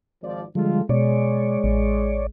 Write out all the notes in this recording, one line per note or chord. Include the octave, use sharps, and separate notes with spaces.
G#1 F3 D5
D3 F3 G3 G#3 F4 A4
B2 G#3 C#5 D5
A1